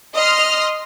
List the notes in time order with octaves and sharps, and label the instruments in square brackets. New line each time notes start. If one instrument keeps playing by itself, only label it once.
[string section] D#5 C6 D#6 F6